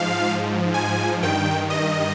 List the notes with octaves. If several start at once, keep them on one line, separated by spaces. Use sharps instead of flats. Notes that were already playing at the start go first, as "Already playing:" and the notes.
Already playing: G#2 F3 F5
G#5
G2 D#3 G5
D#5